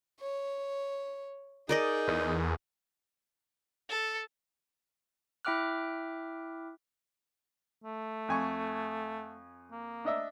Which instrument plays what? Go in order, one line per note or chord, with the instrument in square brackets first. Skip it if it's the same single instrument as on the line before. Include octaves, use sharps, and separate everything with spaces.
[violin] C#5
[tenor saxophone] D#4 [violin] G#4 [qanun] A#4 D5 D#5
[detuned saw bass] E2
[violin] A4
[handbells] E4 E5 G5 D6 F6 F#6
[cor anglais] A3
[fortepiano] F2 G#5 C#6
[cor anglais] A#3
[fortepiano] D4 D#5 E5